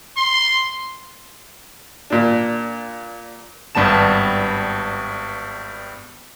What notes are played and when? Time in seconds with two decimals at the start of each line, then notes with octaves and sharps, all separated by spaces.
0.17 C6
2.10 A#2 D4
3.75 G#1 G2 G3 B3 A5 E7